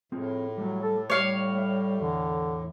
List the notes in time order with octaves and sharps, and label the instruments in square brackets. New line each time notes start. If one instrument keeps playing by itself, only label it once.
[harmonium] A2 [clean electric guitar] C4 F4 G#4
[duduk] F#3 [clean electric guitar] G3 A3
[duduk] A4
[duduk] G3 [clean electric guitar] A3 [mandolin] C#5 F5
[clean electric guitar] E5
[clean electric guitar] E2 [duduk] D3